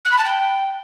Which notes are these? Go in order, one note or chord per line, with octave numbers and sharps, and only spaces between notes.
F#6
B5
A5
G5